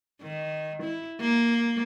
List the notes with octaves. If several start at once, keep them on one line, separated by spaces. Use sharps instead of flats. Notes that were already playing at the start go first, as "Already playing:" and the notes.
D#3
E4
A#3